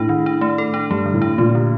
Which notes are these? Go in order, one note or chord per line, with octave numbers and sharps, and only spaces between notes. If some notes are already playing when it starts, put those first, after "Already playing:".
Already playing: A2 D4
D#3
D4
A3
A4
D4
G2 A3
D3
A2
D4
A#2 A3
D3